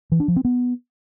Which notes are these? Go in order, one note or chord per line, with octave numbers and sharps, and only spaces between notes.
E3
D4
F3
C4
B3